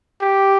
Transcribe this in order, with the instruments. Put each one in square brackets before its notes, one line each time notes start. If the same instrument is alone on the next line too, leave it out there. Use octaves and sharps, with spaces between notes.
[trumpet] G4